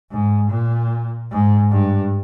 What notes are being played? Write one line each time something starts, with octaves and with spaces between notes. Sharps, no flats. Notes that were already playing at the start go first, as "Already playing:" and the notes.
G#2
A#2
G#2
G2